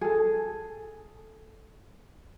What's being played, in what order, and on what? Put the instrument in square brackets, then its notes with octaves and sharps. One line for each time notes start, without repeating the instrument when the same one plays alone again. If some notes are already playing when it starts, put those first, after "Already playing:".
[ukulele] G#4 A4